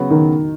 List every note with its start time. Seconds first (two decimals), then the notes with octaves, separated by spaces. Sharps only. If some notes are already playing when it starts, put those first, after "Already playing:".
Already playing: C#3 F#3 B3 F#4
0.10 D#3